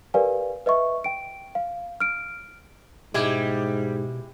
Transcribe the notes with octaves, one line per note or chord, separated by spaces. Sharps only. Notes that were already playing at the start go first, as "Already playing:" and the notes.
G4 A#4 B4 D5 F5 G#5
B4 D#5 E5 C#6
G5 D7
F5
F6 D7
G#2 B2 G3 G#3 E4 G4